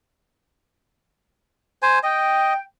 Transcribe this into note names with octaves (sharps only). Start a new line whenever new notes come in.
C5 G#5
D#5 G5